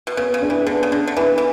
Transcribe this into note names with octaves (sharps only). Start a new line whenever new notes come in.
B2
C#3 B3
C#3
D4 G#4
E3
D3 B3
C#3
D3 D4 G#4
D3
E3 B3
E3